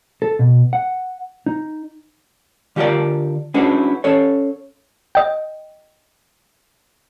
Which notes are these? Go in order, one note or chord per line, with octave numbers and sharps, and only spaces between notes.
A4
B2
F#5
D#4
D3 F4 G4 A4 A#4 D5
C#4 D4 E4 F#4 G#4 B4
C#4 A4 C#5
D#5 G5